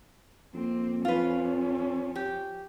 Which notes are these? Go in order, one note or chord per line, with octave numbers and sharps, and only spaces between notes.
F2 A#3 C4
F3 C#4 F4 B4
G4